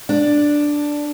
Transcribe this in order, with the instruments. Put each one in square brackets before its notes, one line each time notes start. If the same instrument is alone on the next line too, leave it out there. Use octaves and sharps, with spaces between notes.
[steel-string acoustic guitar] D4